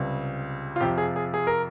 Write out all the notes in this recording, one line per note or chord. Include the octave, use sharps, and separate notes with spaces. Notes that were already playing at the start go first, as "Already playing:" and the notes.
Already playing: C#2 C3 G3
F4
F2 C3 F3 G4
G#4
G#4
G#4
A#4